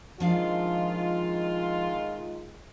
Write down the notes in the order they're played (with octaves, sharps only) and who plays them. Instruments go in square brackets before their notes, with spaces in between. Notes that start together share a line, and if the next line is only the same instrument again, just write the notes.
[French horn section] D#3 G#3 F4 [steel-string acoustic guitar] F3 D4 F5